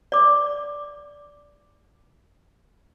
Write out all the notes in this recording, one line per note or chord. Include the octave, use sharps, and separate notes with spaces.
D5 D6